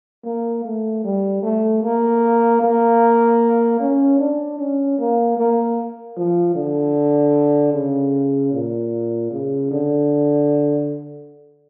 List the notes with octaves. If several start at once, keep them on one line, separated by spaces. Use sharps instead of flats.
A#3
A3
G3
A3
A#3
A#3
C#4
D4
C#4
A#3
A#3
F3
D3
C#3
A#2
C#3
D3